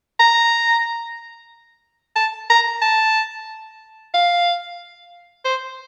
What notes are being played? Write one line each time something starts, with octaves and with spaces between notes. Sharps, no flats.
A#5
A5
A#5
A5
F5
C5